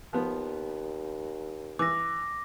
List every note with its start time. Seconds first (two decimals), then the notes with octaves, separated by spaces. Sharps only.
0.13 D#2 F3 B3
1.79 E3 D6 A#6